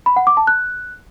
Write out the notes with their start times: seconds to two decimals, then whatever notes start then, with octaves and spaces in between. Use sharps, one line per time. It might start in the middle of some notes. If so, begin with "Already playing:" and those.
0.06 B5
0.16 F#5
0.27 D6
0.37 A5
0.47 F#6